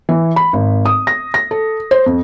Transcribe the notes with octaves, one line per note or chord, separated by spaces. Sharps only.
E3
B5
G#1
D#6
A#6
A#6
A4
C5
F2